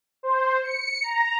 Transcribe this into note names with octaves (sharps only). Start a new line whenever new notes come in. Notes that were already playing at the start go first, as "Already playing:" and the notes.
C5
C#7
A#5